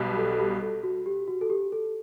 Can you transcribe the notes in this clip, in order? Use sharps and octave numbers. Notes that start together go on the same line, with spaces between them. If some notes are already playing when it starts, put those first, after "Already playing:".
Already playing: B1 B2 G3
A4
A4
G4
A4
F#4
G4
F#4
A4
G4
A4